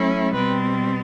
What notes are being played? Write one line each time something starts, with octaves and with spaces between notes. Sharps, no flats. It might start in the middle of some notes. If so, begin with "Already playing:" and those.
Already playing: F#3 A3 C#4 E4
B2 G3 C4 B4